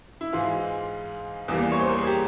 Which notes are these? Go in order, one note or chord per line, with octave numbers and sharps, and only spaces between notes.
E4
G#2 E3 G#3 F4
E2 E3 G3 A#3
C#5
C5
A#4
G#4
G4